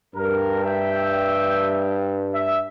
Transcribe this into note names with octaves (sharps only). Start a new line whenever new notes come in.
G2 A#4
E5 G5
E5